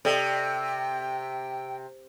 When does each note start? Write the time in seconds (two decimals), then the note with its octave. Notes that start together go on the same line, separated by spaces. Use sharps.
0.05 C3 A4 D5 D#5 G5